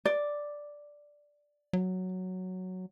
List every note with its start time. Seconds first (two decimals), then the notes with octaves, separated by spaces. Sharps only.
0.05 D5
1.73 F#3